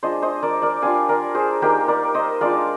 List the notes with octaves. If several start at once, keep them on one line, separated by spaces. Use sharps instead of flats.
G#3 D4 F4 C5 D#5
C5 D#5
A#4 D5
A#4 D5
G3 D4 F4 F5 G#5
A#4 D5
G#4 C5
A#3 D#4 G4 A#4
A#4 D5
C5 D#5
G#3 D4 F4 D5 F5